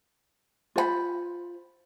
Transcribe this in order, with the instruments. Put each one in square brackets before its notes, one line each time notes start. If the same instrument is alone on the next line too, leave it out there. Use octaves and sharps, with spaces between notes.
[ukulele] F4 C5 G5 B5